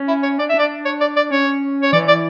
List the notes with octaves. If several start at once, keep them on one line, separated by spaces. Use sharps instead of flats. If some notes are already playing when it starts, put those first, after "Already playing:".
Already playing: C#4
E4
C#5
D4 D5
E5
D4
D5
C#5
D5
D5
C#4 C#5
C#5
E3 D5
D5